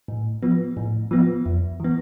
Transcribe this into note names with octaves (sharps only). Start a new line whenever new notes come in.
A2
F3 B3
A2
F3 B3
F2
E3 B3